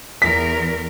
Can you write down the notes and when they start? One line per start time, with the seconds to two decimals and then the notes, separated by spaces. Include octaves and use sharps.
0.22 E2 A#4 B6